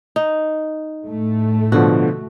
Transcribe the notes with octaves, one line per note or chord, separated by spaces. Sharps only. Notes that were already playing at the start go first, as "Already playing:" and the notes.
D#4
A2 A3
B2 D3 F3 F#4